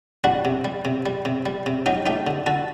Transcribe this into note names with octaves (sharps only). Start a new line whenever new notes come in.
G3 D4 F#4
C3
G3
C3
G3
C3
G3
C3
F#3 D#4 G4
A3 D#4 G4
D3
D3 F#4 A4